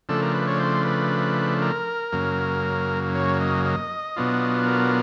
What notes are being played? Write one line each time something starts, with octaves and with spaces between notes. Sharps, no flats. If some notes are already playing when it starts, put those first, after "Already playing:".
C#3 F3 A3 D4 A4
A#4
B4
C#5
C5
B4
A#4
F#2 C#3 F#3 A#3
C#5
D#5
D#5
B2 F#3 B3 D4 F4
A#4